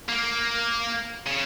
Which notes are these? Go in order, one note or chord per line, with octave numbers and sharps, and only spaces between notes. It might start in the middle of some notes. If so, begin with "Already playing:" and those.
A#3
C#3